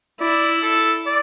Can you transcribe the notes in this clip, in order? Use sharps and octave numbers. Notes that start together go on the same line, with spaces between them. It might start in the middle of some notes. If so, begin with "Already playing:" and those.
E4 D5
A4
D5